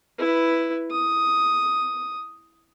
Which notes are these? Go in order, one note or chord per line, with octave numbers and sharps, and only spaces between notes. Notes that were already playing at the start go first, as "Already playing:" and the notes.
E4 B4
D#6